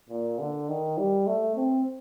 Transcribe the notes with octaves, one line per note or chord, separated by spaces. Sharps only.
A#2
D3
D#3
G3
A3
C4